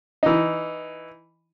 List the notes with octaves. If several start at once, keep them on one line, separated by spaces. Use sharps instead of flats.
E3 D#4